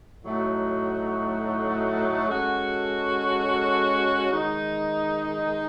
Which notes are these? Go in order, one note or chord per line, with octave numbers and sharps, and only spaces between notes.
A2 F#3 A3 D#4 F#4
G#3 C#4 F#4 A4
D#3 G#3 D#4